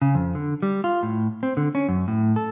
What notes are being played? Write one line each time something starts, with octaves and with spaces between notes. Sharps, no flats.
C#3
F2
D3
G3
F4
A2
C4
D3
C#4
F#2
A2
A4